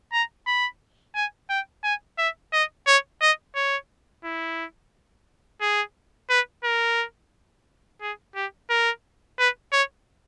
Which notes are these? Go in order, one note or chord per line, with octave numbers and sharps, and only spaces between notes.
A#5
B5
G#5
G5
G#5
E5
D#5
C#5
D#5
C#5
E4
G#4
B4
A#4
G#4
G4
A#4
B4
C#5